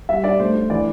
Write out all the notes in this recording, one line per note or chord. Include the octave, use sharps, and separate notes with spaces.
G3 E5
D4 D5
A3 C5
D4
E3 D5